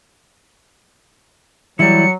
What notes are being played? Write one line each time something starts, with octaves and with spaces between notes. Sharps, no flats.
E3 F#3 G3 E4 C#7